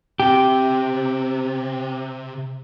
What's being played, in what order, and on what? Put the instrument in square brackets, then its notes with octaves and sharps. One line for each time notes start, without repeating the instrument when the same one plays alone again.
[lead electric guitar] C3 [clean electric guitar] G4